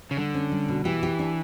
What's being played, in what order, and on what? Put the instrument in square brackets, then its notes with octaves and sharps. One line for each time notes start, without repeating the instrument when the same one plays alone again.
[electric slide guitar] C#3
[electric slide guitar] D3 [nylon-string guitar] G3
[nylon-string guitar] C#4
G3
B2
[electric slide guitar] E3 [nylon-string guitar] G4
[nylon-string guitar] G4
D4